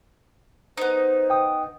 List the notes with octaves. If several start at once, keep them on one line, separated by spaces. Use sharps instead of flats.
B3 D#4 C5
G5 D#6